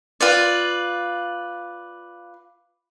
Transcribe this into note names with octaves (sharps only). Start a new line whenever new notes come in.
F4 B4 D5